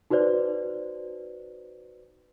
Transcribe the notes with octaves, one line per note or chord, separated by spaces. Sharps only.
D#4 F#4 B4 C5 D5